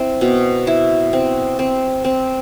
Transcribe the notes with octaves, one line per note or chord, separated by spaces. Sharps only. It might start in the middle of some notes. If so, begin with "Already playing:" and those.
Already playing: C4 E4
B2
E4
C4
C4
C4